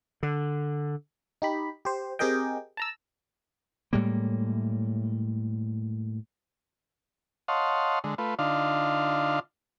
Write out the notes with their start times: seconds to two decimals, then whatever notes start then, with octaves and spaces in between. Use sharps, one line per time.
0.23 D3
1.42 D#4 G4 B5
1.85 G4 C5
2.19 C4 G4 G#4 A#4 D#5 G5
2.77 A5 A#5 E6
3.93 A2 G3 G#3 A#3
7.48 C#5 D#5 F5 F#5 A5 C6
8.04 D3 G#3
8.18 A3 F4 B4
8.39 D3 D4 D#4 F4 F5